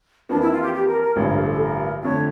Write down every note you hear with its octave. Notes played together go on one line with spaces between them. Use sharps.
F2 E3 A#3 D4
E4
F4
G4
G4
A#4
A#4
A1 G2 D3 F3 C#5
A#4
A4
A4
A#4
F2 D3 A3 C#5